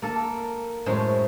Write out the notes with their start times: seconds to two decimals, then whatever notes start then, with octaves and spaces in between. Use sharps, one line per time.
0.02 A#3 A4 A#4
0.86 F#2 A2 G#3 C5